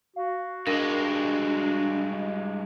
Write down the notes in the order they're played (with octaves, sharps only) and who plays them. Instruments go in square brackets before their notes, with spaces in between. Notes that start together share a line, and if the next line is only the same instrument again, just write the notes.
[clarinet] F#4 [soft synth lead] F5
[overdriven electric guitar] G2 G#3 [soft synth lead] D4 [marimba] A#4